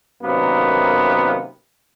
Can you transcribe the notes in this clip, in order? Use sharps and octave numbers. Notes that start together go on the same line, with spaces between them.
F#2 C3 D#3 A#3 B3